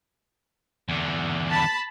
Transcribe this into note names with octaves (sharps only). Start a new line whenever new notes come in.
E2 D3
A5 B5